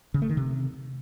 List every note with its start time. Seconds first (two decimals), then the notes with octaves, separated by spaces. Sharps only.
0.14 C#3
0.22 A3
0.29 D#3
0.37 C3